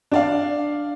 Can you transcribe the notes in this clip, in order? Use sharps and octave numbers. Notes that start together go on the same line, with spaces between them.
D4 D5 F5